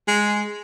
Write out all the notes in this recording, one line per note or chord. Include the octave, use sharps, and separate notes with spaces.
G#3